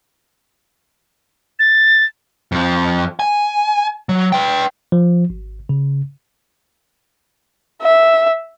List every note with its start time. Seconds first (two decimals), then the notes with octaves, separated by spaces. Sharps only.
1.59 A6
2.52 F2 F3
3.20 G#5
4.09 F#3
4.32 B4 G5
4.92 F3
5.30 G#1
5.69 C#3
7.82 E5